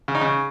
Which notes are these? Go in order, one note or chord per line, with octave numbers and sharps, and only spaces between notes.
C#3
D#4
C#3